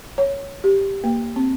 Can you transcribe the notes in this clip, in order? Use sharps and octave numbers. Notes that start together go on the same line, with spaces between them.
C#5
G4
A#3
C4